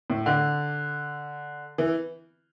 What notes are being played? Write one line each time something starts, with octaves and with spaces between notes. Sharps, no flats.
A2
D3
E3